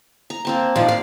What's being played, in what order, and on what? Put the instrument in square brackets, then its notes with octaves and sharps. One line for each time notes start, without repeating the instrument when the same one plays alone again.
[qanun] A#5
A#3 C4 A5
[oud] D#2 A#2 F3 [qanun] D5
[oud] F5